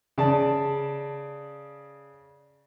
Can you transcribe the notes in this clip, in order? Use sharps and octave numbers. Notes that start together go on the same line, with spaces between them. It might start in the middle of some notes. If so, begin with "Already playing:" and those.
C#3 D5 A5